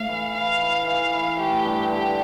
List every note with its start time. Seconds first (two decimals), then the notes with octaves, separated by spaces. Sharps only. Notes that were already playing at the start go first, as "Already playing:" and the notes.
Already playing: A2 F5
0.09 E3
0.34 E4 F5
0.61 E4
0.87 E3 F5
1.13 E4
1.39 A3 G4
1.65 G2
1.91 D3 G4